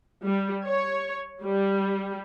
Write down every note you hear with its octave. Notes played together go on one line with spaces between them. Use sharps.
G3
C#5
G3